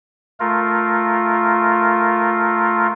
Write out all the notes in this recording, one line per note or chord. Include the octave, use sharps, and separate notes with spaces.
A3 F4 A#4